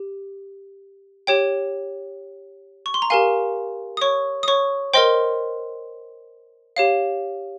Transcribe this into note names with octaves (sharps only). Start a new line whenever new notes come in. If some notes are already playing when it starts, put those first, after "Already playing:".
Already playing: G4
G4 C#5 G5
C#6
C6
A#5
G4 A#4 F5 G#5
D#6
C#5 C#6
D#6
C#5 C#6
A#4 C5 D#5 G5 C6
G4 C#5 F5